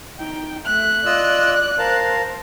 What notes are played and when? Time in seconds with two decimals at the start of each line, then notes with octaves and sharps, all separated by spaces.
0.18 D#4 G5
0.66 A3 E5 F#6
1.06 F4 D5 D#5 E6
1.78 A#4 C5 F5 A5